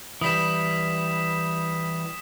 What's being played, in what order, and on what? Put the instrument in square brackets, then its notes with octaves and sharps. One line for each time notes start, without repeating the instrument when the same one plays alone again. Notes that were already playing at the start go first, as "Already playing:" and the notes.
[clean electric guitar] E3 G3 [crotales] D#6 B6 E7